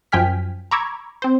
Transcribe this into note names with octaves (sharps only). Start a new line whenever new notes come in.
F#2 F3 G5 G#5 F6 B6
A#5 B5 C#6 D6 E6 G#6
C4 C5